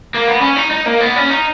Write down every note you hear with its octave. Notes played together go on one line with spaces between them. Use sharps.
A#3
B3
C#4
D#4
D#4
A#3
B3
C#4
D#4